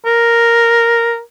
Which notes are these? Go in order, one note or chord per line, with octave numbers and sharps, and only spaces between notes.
A#4